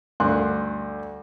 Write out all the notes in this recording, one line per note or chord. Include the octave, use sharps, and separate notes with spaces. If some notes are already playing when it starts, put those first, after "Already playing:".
D2 G2 C6 F#6